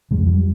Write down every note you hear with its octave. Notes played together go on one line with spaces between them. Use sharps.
F2 C#3 G#3
G3
F3
G3